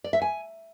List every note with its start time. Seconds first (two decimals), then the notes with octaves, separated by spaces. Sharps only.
0.04 D5
0.13 E5
0.22 G#5